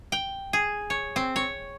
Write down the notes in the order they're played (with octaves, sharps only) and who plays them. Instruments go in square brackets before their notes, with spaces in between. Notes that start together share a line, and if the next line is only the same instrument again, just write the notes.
[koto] G5
G#4
C#5
C4
C#5